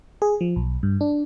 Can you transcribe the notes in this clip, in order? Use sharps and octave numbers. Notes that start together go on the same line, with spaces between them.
G#4
F3
B1
G2
D4